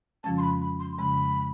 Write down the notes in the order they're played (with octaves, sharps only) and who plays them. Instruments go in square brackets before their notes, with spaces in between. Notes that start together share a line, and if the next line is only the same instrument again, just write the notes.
[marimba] F2 C#3 F3 G#3 C#4 [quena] A5
[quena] C6
B5
B5
C6
[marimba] F2 C#3 F3 G#3 C#4 [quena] B5